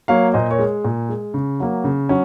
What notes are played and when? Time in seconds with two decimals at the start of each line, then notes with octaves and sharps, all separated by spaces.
0.08 F#3 A#3 C#5 F5
0.34 A#2 C5 D#5
0.50 A#4 C#5
0.59 G#3
0.85 A#2
1.09 G#3
1.34 C#3
1.60 F#3 A#3
1.84 C#3
2.09 F#3 C#4